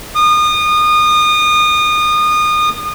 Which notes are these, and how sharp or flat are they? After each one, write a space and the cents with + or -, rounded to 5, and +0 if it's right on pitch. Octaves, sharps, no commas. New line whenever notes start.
D#6 -30